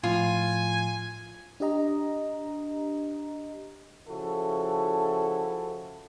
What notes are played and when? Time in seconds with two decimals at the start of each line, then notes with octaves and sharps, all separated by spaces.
0.03 A2 F3 F4 G#5
1.60 D4 G4 D#5 A#5
4.09 C#3 F3 E4 F#4 A4